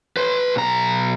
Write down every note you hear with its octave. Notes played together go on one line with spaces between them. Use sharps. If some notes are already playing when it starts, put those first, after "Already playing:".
B4 C6
B1 A#5